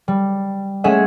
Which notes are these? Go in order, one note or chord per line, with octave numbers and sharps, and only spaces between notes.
G3
G#3 A3 C#4 G#4 E5 F#5